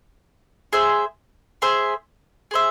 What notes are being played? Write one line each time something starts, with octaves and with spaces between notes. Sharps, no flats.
G#4 C5 E5
G#4 C5 E5
G#4 C5 E5